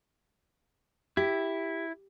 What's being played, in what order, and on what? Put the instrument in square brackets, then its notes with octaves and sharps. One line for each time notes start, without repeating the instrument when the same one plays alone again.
[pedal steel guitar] E4 [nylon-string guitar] G4